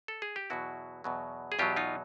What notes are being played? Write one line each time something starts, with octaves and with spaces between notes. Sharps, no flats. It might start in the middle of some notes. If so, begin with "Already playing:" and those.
A4
G#4
G4
E2 B2 F#3 E4 F#4
E2 B2 F#3
G#4
E2 B2 F#3 F4 G4
D#4 F4